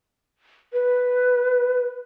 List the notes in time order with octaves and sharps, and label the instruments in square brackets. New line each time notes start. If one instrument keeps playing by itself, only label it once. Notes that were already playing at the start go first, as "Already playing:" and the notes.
[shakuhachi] B4